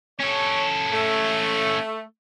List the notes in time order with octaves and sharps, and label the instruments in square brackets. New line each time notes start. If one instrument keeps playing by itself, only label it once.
[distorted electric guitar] C#4 A4 [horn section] C#5
[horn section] A3